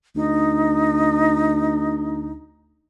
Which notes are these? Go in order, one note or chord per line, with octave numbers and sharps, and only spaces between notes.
D2 D#4